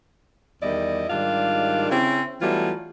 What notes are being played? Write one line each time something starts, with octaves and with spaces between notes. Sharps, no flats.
E2 D#3 G3 E4 D5 D#5
G#2 D#3 G3 D4 F4 F5
C#3 C4 C#4 E4
E3 F#3 G3 A3 B3 F4